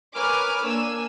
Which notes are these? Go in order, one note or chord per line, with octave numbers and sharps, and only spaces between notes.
A#4 B4 C#5 G#5 D6 F6
A#3 D4 G#5 E6